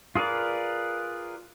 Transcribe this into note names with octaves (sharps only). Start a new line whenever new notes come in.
F4 G#4 A#4 B4 D5